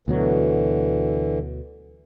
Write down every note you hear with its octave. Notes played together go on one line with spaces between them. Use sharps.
D2 B2 D3 E3 F#3